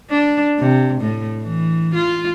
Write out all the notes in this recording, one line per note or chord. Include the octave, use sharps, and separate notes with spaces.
D4
C3
A2
E3
F4